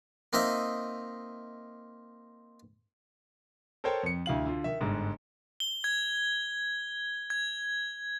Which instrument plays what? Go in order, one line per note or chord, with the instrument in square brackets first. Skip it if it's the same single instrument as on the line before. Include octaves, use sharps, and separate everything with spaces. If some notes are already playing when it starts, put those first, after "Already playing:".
[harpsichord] A#3 C4 D#4 D#5 E5
[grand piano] A4 A#4 C5 C#5 G5 A5
F2 C#7
D2 E4 F5 F#7
D3 F4
D#3 E5
G1 G#2
[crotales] G7
G#6
G#6